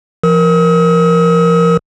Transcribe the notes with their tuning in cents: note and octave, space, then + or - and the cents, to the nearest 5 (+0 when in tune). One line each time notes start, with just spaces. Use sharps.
F3 -35 A#4 +5 D#6 +45